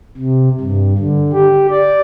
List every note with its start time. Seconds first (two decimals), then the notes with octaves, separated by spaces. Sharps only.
0.17 C3
0.60 G2
0.98 D3
1.33 G4
1.71 D5